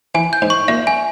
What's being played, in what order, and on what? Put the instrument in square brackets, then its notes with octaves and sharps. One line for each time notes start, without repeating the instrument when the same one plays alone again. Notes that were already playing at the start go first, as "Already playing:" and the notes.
[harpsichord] E3 [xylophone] G#5
[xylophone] G6
[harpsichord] G#2
[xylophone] C#6
[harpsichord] A#2 [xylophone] E5
[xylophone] G#5